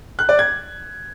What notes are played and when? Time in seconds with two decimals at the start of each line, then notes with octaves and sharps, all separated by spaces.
0.19 F#6
0.29 D5
0.39 G#6